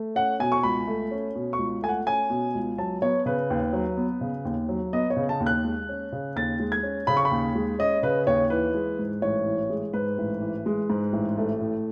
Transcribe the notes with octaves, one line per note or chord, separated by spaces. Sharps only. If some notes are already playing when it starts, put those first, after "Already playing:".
Already playing: A3
C#4 F#5
B2 G#5
C#6
C#2 B5
A3
C#4
B2
C#6
C#2
A3 G#5
F#5
C#4 G#5
B2
C#2
F#3 A5
B3 C#5
C#3 B4
D#2
F#3
B3
C#3
D#2
F#3
B3 D#5
C#5
C#3
A5
D#2
F#6
G#3
C#4
C#3
D#2 A6
G#3
G#6
C#4
C#3 B5
C#6
B5
D#2
G#3
C#4 D#5
C#3 B4
D#2 C#5
E3 B4
G#3
G#2
A1 C#5
E3
G#3
G#2 B4
A1
E3
G#3
G#2
A1
A3
A2